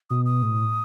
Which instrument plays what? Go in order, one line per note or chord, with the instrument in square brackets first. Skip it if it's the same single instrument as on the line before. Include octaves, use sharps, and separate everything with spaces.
[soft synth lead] B2 [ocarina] D#6
[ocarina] D#6
[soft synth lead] A2